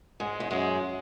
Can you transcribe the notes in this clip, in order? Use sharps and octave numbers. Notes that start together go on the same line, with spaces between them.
G#2 G#3
E2
F#2 G#3